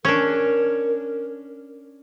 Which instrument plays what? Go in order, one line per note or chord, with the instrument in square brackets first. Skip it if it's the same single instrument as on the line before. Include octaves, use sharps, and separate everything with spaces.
[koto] C#4 D4 [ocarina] A#4